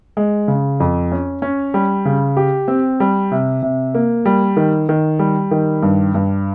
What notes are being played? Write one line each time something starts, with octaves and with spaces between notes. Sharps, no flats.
G#3
C#3
F2
C#4
C#4
G3
C#3
G4
C4
G3
C3
C3
A#3
G3
D#3
D#3
G3
D#3
G2
G2